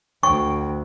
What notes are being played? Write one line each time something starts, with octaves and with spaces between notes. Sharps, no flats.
D2 G5 C#6